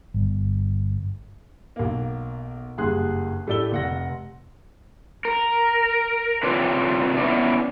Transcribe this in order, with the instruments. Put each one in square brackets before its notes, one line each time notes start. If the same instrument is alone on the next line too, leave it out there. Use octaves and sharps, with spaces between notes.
[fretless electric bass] G1
[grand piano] B1 A#3
F#1 G2 G#4 C6 F#6
A2 A3 G4 D5 E6 G7
F1 F#5 A#6
[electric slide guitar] A#4
C3 D4 F4 B4 C#5 D5
B3 C#4 E4 D5